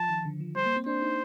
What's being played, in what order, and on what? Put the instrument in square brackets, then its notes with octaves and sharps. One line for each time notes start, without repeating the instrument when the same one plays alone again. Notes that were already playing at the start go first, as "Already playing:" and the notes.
Already playing: [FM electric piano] F3 [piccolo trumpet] A5
[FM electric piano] D#3
D3
F3
[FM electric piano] G3 [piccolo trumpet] C5
[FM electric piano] A#3
C4
[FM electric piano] D4 [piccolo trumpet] C5
[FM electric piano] D#4